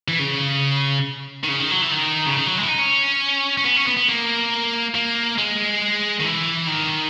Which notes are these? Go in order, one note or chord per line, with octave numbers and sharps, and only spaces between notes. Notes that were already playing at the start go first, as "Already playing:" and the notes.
E3
C#3
D#3
C#3
D#3
F#3
E3
D#3
C#3
D#3
F#3
G#3
E4
D#4
C#4
C#4
B3
C#4
B3
B3
A#3
A#3
G#3
D#3
E3
D#3